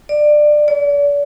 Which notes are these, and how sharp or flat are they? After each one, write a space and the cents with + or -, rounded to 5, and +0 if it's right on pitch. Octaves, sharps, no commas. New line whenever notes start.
D5 +20
D5 -40